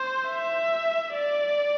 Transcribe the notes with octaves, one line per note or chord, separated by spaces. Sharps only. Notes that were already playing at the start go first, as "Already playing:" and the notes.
Already playing: C5
E5
D5